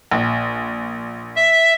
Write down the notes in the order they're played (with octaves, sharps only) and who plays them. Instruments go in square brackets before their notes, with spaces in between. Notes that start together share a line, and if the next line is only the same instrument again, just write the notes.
[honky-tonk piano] A#1
[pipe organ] E5